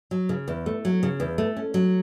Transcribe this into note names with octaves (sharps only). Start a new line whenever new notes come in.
F#3
C#3
E2
A3
F#3
C#3
E2
A3
C#4
F#3